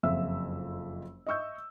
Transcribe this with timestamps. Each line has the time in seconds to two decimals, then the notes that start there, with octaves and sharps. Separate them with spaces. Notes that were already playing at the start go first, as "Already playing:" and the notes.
0.03 F#1 F2 C4 F4 E5 E6
1.27 D#5 E5 C#6 E6 G6